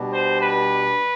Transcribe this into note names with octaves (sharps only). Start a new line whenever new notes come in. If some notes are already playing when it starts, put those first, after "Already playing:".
Already playing: B2 G3 D4
C5
B4